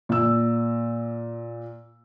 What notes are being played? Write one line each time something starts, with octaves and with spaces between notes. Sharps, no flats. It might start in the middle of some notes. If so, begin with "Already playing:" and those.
A#2 E6